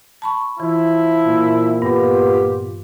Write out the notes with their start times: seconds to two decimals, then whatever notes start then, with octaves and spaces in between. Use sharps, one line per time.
0.22 A5 B5 C#6
0.60 E3 F3 E4
1.27 A#2
1.82 G2 B3 F4 G4